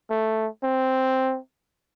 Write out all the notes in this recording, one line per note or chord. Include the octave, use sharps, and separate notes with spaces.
A3
C4